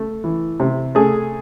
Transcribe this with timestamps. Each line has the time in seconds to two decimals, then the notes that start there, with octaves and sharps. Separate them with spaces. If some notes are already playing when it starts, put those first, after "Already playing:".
Already playing: A3
0.24 E3
0.60 C3
0.95 A3 G#4